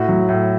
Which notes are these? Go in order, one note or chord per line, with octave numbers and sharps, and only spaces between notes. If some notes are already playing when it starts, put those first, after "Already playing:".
Already playing: A2 F#4
F#3
A2